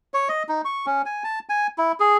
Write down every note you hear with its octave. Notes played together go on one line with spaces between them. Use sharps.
C#5
D#5
D#4
C#6
C#4
G#5
A5
G#5
E4
G#4